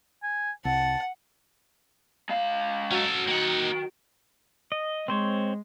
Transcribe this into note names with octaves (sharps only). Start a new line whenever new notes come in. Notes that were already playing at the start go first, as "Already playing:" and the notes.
G#5
C2 F#5 A5
G#3 F5
F#3 C#4 A4
D#3 A#3 F#5
D#5
G#3 C4 C5 C#5